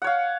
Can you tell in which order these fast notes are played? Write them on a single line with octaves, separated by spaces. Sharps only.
F#5 C#5 F5